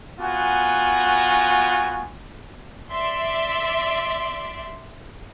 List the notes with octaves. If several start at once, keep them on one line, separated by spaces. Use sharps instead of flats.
B3 F4 F#4 G#5
D5 E5 C6